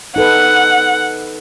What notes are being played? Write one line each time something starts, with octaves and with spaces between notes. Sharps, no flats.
D#4 A4 B4 F#5